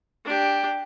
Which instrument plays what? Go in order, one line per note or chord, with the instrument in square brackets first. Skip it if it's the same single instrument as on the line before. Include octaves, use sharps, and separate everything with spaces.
[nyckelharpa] D4 G4